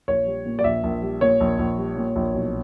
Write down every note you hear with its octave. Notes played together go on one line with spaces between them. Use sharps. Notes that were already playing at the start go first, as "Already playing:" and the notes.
A#1 C#5
G3
A#2
D5
A#1 E5
A#1
G3
A#2 C#5
A#1
A#1
G3
A#2
A#1
B1